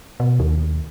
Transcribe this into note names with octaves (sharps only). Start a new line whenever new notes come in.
B2
D#2